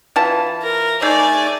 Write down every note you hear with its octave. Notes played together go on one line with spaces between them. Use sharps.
E3 F4 A5
A#4
A3 D#4 G#4 D5 G#5